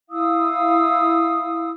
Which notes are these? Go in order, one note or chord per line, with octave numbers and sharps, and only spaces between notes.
E4 F5 D#6 E6